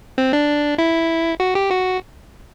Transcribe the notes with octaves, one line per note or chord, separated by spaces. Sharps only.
C4
D4
E4
F#4
G4
F#4